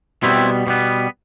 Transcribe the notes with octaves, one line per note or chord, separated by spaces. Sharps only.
B2 G3 B3 C4 E4
B2 G3 B3